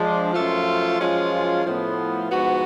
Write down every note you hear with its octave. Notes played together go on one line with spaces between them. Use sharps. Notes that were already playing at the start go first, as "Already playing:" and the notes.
Already playing: F3 G#3 D4
F#2 F3 A3 F4
F#2 F3 G#3 C#4 F4
A2 F3 B3
G#2 F3 B3 F#4